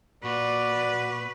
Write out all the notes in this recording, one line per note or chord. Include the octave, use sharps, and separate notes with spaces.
A#2 F#4 B4 D5